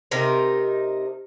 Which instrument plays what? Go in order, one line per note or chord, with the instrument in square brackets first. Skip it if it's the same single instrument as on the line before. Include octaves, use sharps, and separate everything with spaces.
[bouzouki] C3 D#4 A#4